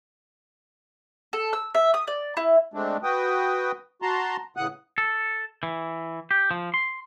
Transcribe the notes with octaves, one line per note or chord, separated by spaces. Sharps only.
A4
E6
E5
D#6
D5
E4
G#3 A3 C4 D4
F#4 B4 G5 D#6
F#4 A5 A#5 C6
A2 C#3 E3 F#5 D#6 F#6
A4
E3
G4
F3
C6